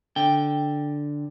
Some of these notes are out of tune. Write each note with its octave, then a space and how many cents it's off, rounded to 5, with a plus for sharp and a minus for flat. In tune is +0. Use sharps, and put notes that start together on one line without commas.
D3 +0 G5 +0